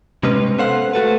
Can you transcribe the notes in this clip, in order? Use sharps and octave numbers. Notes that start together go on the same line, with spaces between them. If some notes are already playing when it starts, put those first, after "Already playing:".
C3 G#3 C#4 B4
B3 A4 C5 F5 F#5
A3 F#4 A4 B4